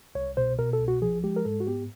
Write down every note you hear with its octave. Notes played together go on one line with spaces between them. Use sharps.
C2 C#5
B2 C5
B2 A#4
A4
C2
F#4
F3 G#4
G#3 G4
A#4
G#2 A4
F#4
B3 G4